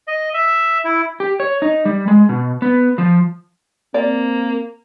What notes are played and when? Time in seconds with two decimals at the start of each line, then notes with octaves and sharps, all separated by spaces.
0.08 D#5
0.34 E5
0.85 E4
1.20 G4
1.40 C#5
1.62 D#4
1.85 G3
2.08 G#3
2.29 B2
2.62 B3
2.98 F3
3.94 A#3 C4 D5